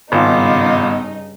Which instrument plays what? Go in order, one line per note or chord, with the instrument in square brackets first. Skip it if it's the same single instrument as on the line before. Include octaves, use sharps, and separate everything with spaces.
[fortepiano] G#1 [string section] G2 C#3 D#4 [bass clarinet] B3 [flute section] F4 D6